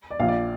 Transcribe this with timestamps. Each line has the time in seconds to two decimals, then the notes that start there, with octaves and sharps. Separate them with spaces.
0.11 D5
0.19 A#1 A#2 F3 F5
0.28 D5